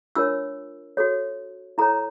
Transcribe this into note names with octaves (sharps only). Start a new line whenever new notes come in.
D4 F4 A#4 C#5 E6
F#4 A4 C#5
E4 A4 C#5 A#5